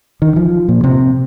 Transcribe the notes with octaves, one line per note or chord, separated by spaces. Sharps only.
D#3
F3
A#2
C3